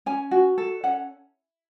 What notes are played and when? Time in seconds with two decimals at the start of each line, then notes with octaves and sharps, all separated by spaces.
0.06 C#4 G#5
0.31 F#4
0.58 A4
0.83 C#4 F#5